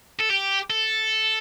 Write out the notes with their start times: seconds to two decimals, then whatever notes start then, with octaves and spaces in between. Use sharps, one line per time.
0.19 A4
0.29 G4
0.70 A4